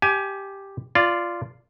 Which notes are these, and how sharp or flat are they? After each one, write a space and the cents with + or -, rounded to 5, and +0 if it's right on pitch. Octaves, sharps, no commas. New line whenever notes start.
G4 +0 G#5 +25
F4 -10 D5 +0